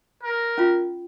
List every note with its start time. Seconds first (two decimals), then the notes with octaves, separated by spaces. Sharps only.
0.23 A#4
0.58 C#4 F4